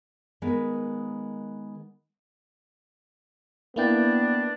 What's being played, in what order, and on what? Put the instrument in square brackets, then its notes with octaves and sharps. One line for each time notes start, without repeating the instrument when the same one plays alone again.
[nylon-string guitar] D#3 G#3 B3 A#4 B4
[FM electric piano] A#3 E4 G5 [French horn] B3 [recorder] D4